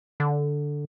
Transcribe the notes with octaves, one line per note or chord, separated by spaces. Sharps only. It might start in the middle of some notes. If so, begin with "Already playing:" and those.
D3